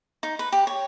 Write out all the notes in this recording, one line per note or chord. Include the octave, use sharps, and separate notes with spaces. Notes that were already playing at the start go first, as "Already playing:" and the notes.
D#4
B4
G4
C#5